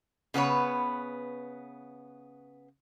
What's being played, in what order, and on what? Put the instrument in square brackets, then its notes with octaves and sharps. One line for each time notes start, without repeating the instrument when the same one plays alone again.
[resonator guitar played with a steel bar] C#3 B3 B4 C#5